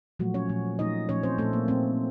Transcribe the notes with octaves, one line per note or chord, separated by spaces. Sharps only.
A#2 F3 F#3 A3 F#4
C#4 C#5
A#2 F3 A3
A#2 F3 A3 D#4 D#5
A#2 F3 A3 C#4 C#5
C4 C5
A#2 A3 A4
A#3
A#2 A3 C4